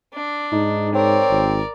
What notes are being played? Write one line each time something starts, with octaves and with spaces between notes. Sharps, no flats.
D4
G#2 D#4
C4 A#4 C#5 D5
G#1